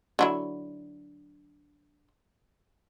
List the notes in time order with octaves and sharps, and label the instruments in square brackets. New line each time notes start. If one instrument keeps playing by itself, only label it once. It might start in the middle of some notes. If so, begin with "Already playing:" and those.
[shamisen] D3 F#3 E4